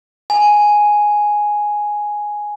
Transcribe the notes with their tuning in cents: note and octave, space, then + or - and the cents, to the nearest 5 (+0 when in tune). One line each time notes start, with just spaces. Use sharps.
G#5 +5